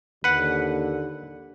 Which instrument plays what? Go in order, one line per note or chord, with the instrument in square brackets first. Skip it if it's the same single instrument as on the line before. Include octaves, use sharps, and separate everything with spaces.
[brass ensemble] D#2 D3 [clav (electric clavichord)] B4 F#5